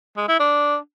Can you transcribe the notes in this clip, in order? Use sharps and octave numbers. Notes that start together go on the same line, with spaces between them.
G#3
E4
D4